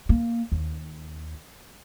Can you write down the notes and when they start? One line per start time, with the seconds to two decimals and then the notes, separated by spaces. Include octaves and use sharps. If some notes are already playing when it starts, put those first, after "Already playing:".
0.09 A#3
0.52 D#2